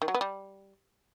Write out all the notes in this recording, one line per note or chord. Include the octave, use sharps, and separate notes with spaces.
D#3
F#3
B3
G3